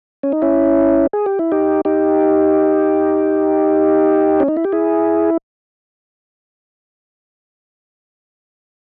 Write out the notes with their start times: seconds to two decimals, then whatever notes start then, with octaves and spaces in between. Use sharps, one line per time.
0.23 C#4
0.32 D#4
0.42 C#4 E4
1.13 G#4
1.26 G4
1.39 E4
1.52 D#4 G4
1.85 D#4 G4
4.40 C#4
4.48 D#4
4.57 E4
4.64 G4
4.72 E4 G#4